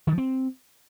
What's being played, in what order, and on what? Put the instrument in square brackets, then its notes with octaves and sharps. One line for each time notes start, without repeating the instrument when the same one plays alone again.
[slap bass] D#3
F3
C4